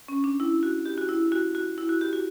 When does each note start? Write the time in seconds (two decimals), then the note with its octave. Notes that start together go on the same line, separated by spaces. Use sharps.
0.08 C#4
0.24 D4
0.40 E4
0.63 F#4
0.86 G4
0.98 F#4
1.09 E4
1.32 F#4
1.55 F#4
1.78 E4
1.89 F#4
2.01 G4
2.13 F#4